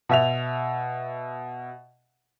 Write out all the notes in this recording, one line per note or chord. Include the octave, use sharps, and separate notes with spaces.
B2 E5 F7